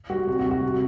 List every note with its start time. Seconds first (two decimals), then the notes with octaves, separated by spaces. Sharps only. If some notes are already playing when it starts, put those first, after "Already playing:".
0.10 G3 F#4
0.27 C3 F#4
0.39 F#4
0.45 G3
0.51 F#4
0.63 C3